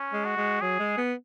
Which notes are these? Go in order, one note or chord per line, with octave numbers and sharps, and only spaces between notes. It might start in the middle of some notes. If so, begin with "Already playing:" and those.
Already playing: C#4
G#3
F#4
G#3
F#3 G#4
G#3
B3